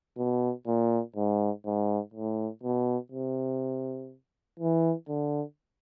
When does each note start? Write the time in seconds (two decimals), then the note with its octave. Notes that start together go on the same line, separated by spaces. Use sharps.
0.18 B2
0.67 A#2
1.16 G#2
1.65 G#2
2.14 A2
2.63 B2
3.12 C3
4.60 E3
5.09 D3